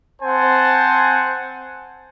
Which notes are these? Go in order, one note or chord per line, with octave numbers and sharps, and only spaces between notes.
C4 C5 F#5 G#5 A5